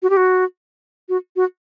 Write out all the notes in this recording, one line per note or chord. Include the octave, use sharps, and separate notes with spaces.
F#4
G4
F#4
F#4
F#4